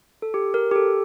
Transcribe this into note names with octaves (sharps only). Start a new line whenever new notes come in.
A4
G4
A#4
G4
A4